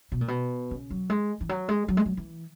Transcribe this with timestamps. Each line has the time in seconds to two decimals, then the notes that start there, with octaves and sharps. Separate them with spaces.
0.12 B2
0.21 A#2
0.28 B2
0.71 C#3
0.90 F#3
1.10 G#3
1.41 E3
1.49 F#3
1.69 G#3
1.88 F#3
1.97 G#3
2.06 F#3
2.17 E3